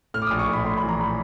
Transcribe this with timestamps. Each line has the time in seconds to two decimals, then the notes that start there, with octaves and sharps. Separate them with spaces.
0.14 A2 F6
0.22 D6
0.27 A#1 D#6
0.39 C#6
0.49 A#1 B5
0.65 A2 C6
0.77 B5
0.83 E3
0.89 A#5
1.00 A2 B5